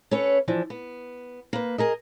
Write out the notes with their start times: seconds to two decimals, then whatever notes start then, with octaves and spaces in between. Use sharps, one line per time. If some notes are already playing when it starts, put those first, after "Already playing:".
0.11 C#4 A4 B4 C#5
0.48 E3 F3 D4
0.70 B3
1.53 A#3 B4
1.78 G#4 A#4 D#5